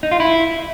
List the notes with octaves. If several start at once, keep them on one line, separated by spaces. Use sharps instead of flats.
D#4
F4
E4